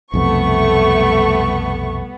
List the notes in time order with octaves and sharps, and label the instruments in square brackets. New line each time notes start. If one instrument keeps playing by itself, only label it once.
[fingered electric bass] B1 F2 C3 [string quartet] G3 B3 [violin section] A3 C#6